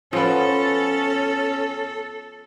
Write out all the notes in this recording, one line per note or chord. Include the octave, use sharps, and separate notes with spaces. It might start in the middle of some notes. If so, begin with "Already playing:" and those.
F3 B3 C#4 A4